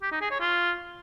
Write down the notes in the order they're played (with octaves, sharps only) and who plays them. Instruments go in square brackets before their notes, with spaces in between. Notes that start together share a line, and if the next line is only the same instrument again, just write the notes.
[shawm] G4
D#4
G#4
C#5
F4